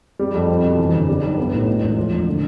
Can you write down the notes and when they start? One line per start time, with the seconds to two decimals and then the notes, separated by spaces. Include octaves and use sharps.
0.19 G3
0.34 F2
0.49 C4
0.64 B2
0.78 E3
0.93 G1
1.08 G3
1.23 B1
1.37 B3
1.53 A2
1.67 B2
1.82 E1
1.97 F3
2.11 A1
2.27 D3